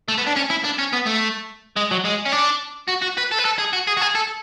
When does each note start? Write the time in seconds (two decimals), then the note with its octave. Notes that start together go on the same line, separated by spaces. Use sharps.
0.08 A3
0.18 B3
0.27 D4
0.36 C#4
0.50 E4
0.65 D4
0.79 C#4
0.93 B3
1.06 A3
1.76 G#3
1.91 F#3
2.05 G#3
2.26 C#4
2.33 D4
2.89 F#4
3.02 F#4
3.18 B4
3.31 A4
3.38 B4
3.45 A4
3.58 G#4
3.73 F#4
3.87 G#4
3.97 F#4
4.01 G#4
4.15 A4